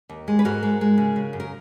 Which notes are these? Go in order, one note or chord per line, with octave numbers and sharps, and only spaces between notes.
D#2
G#3
B4
G#2 F#4 A#4
G#3
G#3
C#3
C#3
F#2
A#4